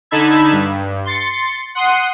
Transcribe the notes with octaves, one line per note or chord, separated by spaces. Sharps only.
D3 D#4 A5 B5 E6 G#6
G2
C6 A6 C#7
F#5 C6 D#6